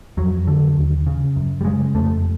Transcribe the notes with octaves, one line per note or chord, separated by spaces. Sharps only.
F2 F#3
D3
D#2
C#3
F#2
G3
C#3 G#3
F2 A3